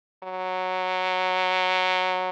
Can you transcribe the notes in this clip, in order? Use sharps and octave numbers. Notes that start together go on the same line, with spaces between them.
F#3